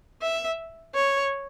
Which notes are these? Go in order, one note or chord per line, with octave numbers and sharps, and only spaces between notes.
E5
C#5